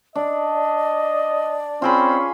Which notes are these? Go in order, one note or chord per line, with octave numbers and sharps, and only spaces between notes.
D4 D5 D#5
C4 C#4 F4 G#4 B5